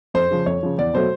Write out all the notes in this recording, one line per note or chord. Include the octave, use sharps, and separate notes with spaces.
F2 C5
C#3 F3
F2 C#5
C#3 F3
E2 D5
B2 F#3 A3 C5